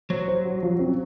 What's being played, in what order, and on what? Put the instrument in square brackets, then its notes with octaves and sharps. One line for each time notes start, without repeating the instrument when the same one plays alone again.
[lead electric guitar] F#3 [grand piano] C5
[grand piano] C5
F#4
F3
C4